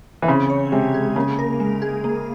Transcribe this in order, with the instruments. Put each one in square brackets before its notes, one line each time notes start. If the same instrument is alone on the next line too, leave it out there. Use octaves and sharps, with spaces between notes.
[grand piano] E3
[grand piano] C#3 [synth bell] C4
[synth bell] C#5
[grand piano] C3 [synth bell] G#3
[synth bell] G#4
[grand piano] C#3 [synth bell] A#3
[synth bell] A#4
G#3
G#4
A#3